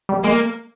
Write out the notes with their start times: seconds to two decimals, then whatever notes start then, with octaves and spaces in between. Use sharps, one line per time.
0.09 G3
0.24 G#3 A#3